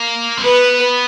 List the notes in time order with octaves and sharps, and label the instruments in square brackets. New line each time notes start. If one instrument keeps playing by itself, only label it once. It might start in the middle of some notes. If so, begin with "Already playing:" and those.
Already playing: [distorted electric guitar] A#3
C4
[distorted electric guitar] B3 [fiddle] B4